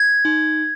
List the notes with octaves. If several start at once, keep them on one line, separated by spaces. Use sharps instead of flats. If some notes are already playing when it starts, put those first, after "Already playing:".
Already playing: G#6
D#4